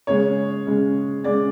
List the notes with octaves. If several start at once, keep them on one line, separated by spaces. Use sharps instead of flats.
C#3 G#3 C#4 C#5
C#3 G#3 C#4
C#3 G#3 C#4 D5